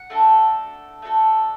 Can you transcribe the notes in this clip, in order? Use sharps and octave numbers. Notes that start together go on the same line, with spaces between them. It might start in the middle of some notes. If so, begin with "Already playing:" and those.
Already playing: F#5
A3 D4 F#4 A4
A3 D4 F#4 A4